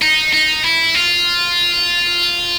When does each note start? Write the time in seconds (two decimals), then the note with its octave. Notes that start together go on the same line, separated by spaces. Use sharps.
0.02 D#4
0.33 D#4
0.64 E4
0.95 F4